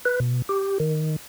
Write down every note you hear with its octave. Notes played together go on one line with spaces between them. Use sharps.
B4
B2
G4
D#3